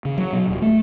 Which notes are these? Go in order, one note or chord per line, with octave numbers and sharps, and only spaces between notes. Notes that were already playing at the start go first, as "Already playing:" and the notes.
C#3
F#3
B2
D#1
A3